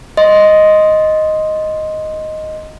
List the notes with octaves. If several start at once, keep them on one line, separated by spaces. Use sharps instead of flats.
D#5 C6